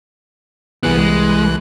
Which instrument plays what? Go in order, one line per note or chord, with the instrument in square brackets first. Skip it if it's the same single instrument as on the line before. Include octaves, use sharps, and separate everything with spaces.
[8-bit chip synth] C2 E3 F#6 [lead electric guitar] B3 G#4
[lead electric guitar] G#3